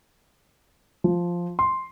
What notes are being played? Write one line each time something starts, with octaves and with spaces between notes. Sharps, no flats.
F3
C6